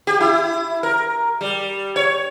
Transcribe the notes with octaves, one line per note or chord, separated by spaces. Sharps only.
G4
E4
A#4
G3
C#5